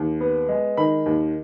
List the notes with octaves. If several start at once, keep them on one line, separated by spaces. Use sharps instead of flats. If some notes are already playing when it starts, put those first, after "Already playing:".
Already playing: D#2
B3
G#3
D#3 B5
D#2